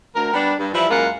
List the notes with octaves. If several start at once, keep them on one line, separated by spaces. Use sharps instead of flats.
D2 A#4
G3 B3 D4
G2
E3 F3 G3 E4
F#2 G#3 A#3 F4 F#5